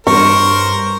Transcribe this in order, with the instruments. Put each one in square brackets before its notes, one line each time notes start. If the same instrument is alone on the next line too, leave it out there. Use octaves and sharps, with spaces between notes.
[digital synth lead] G2 [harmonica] A#4 C5 [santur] C#6